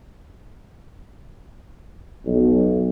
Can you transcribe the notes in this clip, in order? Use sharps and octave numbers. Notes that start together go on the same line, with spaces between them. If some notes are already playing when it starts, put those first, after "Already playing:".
B1